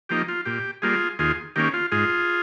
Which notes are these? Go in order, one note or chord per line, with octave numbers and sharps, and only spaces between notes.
F3 A#3 D#4 G4
F4
A#2 G4
G3 A#3 F4 G#4
D#2 F4 G#4
D#3 A#3 C#4 G4
F4
G#2 F4 G#4